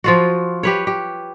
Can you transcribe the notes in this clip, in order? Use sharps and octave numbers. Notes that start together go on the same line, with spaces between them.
F3 F4 F#4
G4 B4 C#5
G4